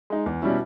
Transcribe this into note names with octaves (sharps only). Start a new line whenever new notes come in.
G#3 D#4
E2
B2 G3 C#4 E4